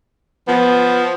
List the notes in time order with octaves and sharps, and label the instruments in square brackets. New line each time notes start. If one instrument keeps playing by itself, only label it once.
[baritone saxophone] F3 [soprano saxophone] B3